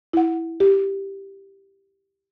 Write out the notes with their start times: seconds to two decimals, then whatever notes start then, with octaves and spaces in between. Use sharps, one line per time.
0.13 E4 F#5
0.60 G4